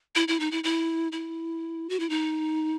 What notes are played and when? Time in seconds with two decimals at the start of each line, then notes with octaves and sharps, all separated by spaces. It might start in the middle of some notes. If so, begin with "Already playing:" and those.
0.15 E4
0.28 E4
0.40 D#4
0.51 E4
0.64 E4
1.12 E4
1.89 F#4
2.00 E4
2.10 D#4